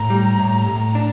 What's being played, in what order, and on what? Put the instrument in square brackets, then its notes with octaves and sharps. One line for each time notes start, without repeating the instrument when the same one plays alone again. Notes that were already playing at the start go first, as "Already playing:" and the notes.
Already playing: [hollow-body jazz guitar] A2 [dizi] A#5
[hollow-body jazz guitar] G3
A2
A2
D4